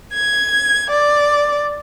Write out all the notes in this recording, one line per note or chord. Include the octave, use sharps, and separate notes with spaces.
G#6
D5